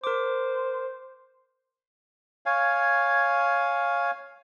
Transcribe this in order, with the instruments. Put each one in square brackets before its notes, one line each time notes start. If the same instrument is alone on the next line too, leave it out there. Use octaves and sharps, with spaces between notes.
[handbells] A#4 D6 [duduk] C5
[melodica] C#5 F5 G#5